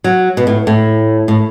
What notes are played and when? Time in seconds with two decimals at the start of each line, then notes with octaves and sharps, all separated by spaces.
0.04 F#3
0.37 B2
0.47 A2
0.67 A2
1.28 A2